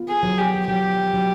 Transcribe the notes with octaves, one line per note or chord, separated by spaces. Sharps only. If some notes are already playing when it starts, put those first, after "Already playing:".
Already playing: B3 F4
G#4
F#3
G4
F#3 G4
F#3